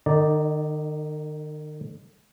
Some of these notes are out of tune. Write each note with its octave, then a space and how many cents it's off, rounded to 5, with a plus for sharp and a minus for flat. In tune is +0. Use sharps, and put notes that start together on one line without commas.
D#3 -40 D#4 +0 D5 +0